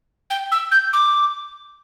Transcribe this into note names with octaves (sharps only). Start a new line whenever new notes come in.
G5
E6
G6
D6